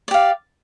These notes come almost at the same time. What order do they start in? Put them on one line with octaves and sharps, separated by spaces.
D5 G4 F5